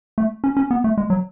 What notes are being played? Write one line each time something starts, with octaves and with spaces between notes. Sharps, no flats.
A3
C#4
C#4
B3
A3
G#3
F#3